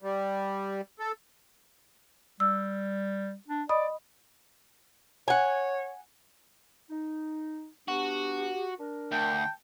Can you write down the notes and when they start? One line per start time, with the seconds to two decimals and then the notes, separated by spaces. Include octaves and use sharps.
0.02 G3
0.99 A4
2.40 G3 E6
3.48 D4
3.69 D5 D#5 B5 D#6
5.28 C#5 F#5 G#5
6.90 D#4
7.88 B3 D4 F#4 G4
8.80 D4 A#4
9.12 D2 G5 A5